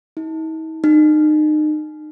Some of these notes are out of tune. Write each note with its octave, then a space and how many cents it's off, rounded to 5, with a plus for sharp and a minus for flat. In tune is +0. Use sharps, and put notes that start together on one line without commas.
D#4 +45
D#4 -30